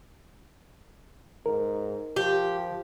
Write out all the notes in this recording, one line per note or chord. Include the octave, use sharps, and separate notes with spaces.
G#2 A#4
F3 G4